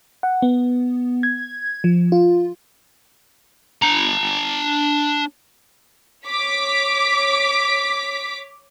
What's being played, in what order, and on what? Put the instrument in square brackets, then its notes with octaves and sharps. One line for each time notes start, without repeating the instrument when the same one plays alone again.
[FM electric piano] F#5
B3
G#6
F3
F4
[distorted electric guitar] D4 A#5
[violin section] C#5 D6 B6